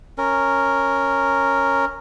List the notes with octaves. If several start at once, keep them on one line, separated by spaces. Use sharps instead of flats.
C#4 A#4